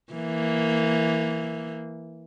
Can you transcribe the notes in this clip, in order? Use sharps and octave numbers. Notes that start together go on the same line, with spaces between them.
E3 A#3